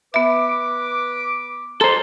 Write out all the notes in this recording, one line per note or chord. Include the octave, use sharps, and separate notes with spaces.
B3 B4 E5 D6
A4 C5 A#5 C6